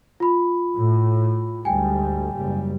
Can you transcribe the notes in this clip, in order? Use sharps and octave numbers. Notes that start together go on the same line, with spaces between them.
F4 B5
A2
D2 G#2 G3 G5 G#5
F#1 G3